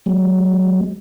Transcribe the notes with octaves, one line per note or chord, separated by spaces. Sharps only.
F#3 G#3